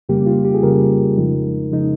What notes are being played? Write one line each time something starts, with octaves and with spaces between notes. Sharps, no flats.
F2 C#3 G3 A#3 G4
F4
G4
G#4
F2 C#3 G3 A#3 A#4
F2 C#3 F3 G#3 D#4
C#3 F3 G#3 D#4